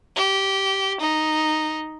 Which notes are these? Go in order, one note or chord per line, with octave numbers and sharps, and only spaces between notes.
G4
D#4